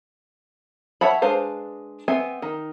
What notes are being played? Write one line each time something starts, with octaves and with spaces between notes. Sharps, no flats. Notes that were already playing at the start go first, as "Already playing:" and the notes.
C#5 E5 F#5 A5 B5
G#3 D4 B4 C5 F5
B3 C4 E5 G#5
D#3